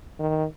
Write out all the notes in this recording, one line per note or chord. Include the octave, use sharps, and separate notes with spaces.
D#3